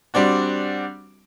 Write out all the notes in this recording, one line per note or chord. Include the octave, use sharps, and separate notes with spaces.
G3 C4 D4 F#4